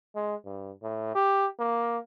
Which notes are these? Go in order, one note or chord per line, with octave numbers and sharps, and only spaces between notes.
G#3
G2
A2
G4
A#3